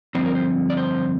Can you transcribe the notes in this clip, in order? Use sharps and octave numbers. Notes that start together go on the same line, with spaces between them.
G2 D3 F3 C4 C5
A#4
C5
D5
C5